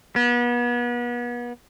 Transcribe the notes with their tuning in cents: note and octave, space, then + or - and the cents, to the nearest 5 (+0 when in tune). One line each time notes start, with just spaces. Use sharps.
B3 -35